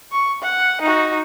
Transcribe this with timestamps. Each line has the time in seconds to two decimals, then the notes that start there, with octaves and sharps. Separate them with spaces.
0.12 C#6
0.42 F#5
0.82 D#4 F#4